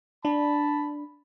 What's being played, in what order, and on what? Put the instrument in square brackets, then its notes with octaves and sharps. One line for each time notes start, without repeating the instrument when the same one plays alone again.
[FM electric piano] D4 [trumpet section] A5 B5